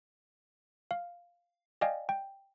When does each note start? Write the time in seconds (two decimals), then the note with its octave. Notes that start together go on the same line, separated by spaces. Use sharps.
0.91 F5
1.81 D5 D#5 F5 G5 G#5
2.09 G5